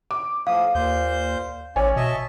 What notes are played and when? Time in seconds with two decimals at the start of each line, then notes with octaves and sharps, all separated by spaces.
0.11 D6
0.47 A2 F3 F5 D#6
0.75 D#2 A#2 C5 G6
1.76 A1 C#4 C#5 D5 G#5
1.96 B2 D#5 E5 A5